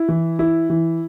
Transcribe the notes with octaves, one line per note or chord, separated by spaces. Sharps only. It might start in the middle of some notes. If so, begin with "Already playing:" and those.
Already playing: E4
E3
E4
E3